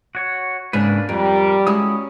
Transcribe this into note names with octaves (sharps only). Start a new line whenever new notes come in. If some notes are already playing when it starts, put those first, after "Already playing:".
F#4 C#5
G#2 C#3 A#3 D4 B4
F2 G3 A#4
G#3 C#4 E4 F#4 D#6